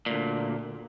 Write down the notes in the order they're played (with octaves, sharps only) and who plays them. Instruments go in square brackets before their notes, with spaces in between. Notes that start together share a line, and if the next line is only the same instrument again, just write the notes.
[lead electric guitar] D2 A#2